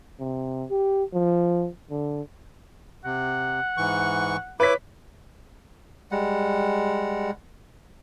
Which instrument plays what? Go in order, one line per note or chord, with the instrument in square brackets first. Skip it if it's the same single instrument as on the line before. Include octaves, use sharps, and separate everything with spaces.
[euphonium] C3
G4
F3
D3
[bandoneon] C3 [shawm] F#5
[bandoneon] G#2 E3 C#6
[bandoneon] E4 D6 [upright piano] B4 C#5 B6
[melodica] G3 G#3 F#5